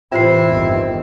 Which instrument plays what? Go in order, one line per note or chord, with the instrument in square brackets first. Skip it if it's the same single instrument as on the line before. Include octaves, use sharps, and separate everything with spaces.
[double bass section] A2 C3 E3 [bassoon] C4 [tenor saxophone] E4 [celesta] F4 C5 C7
[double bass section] G1 E2 D#3